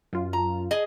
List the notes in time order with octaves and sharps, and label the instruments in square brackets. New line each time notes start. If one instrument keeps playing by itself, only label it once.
[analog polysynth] F#2 F4
[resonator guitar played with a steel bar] A#5
G#4 D#5